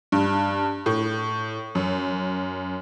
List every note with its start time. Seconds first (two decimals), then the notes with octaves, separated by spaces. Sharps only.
0.12 G2
0.86 A2
1.75 F#2